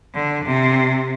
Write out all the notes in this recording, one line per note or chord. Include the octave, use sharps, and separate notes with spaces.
D3
C3